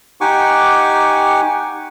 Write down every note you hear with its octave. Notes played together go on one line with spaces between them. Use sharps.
D#4 G4 F#5 G#5 C#6 D6